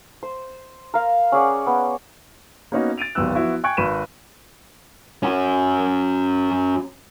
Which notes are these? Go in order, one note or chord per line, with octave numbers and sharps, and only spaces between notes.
C5
A#4 F5
C#4 G#4 D5 F#5
B3
A#3 B3 C#4 D#4 F#4
A6 D7 D#7 F7
D1 G#1 B3 G4 E6 F#6
F3 B3 E4 F#4
G5 G#5 C#6 F#6 G#6 D7
G#1 B4 B5 C#6 D#7 E7
C#4 F#4